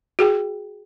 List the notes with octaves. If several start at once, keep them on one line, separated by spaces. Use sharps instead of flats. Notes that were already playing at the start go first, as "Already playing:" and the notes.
F#4 G#4 G5